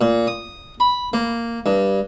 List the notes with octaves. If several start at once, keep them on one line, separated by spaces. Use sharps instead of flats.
A#2
D#6
B5
A#3
G2